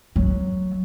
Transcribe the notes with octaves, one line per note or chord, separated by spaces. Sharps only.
F#3